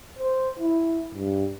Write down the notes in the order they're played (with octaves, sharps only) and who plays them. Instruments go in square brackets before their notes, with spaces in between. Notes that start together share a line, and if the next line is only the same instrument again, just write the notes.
[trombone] C5
E4
G2